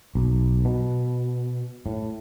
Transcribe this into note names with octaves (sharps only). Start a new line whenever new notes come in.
B1
B2
A2